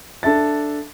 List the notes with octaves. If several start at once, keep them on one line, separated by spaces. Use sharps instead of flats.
D4 A4 E5 A6